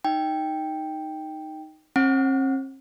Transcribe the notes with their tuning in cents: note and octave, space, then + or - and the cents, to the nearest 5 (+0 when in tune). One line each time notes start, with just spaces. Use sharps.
D#4 +0 G5 +0
C4 +45 F#5 +0